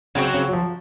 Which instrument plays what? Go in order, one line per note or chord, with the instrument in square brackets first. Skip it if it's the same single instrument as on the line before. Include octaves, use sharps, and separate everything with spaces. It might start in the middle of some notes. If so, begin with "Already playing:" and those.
[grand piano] C#3 [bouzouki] F#3 C4 F#4
[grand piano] C#3
F#3
F3